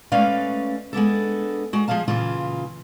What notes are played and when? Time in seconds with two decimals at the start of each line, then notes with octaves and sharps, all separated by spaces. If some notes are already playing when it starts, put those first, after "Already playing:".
0.12 G#3 A3 C#4 B4 D5 F5
0.93 G#3 B3 D4 A4
1.73 G#3 F#4
1.88 F3 G#3 G#4 F5 A5
2.08 A#2 C#3 E3 F4